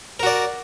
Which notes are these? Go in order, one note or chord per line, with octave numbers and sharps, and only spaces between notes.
F#4 A#4 D5